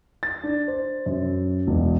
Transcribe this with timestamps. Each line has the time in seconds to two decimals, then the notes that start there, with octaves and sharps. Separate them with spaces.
0.23 A6
0.43 D4
0.68 C5
1.06 F#2
1.67 E1